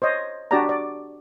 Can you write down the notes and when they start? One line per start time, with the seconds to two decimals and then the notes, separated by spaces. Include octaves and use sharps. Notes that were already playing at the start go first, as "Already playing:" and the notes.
0.02 C5 C#5 D#5
0.51 D4 F#4 G4 D5 A5 A#5
0.69 D5